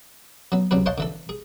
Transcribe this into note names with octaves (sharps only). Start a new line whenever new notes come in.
F#3 B3
C#2 C3 F#3 G#4 B4
C5 C#5 D#5 F5 F#5 A5
D3 E3 A4
G#4